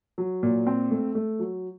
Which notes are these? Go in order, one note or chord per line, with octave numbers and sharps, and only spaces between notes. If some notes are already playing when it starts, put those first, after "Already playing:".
F#3
A#2
C4
A3
A3
F#3